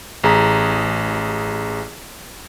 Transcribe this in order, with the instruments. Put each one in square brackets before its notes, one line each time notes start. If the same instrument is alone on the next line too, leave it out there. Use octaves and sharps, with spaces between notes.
[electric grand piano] A1 G#4 A#5 B6